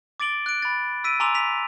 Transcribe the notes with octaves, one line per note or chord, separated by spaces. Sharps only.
D6 A6 D7 F#7 G7
F#6 D7
B5 A6
E6 B6 D7 D#7
G#5 A#5 C6 D6 E6 F7
B6 F7